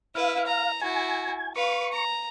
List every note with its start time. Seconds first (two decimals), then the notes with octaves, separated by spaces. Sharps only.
0.15 E4 B4 F5
0.47 A#5
0.81 E4 F#4 G#5
1.56 B4 F5 C#6
1.93 A#5